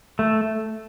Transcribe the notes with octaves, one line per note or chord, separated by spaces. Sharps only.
A3